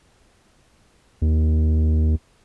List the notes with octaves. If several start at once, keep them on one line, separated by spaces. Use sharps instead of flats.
D#2